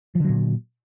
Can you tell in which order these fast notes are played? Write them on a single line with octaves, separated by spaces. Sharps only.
F3 D3 F#3 A#2